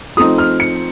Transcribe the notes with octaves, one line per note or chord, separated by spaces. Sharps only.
F3 A3 C4 D#4 D#6
F6
C#7